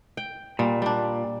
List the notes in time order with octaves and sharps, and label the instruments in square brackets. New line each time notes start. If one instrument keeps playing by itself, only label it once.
[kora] G5
[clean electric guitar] A#2 [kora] G3
[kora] G3 D4